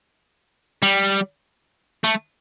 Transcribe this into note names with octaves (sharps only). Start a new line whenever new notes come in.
G3
A3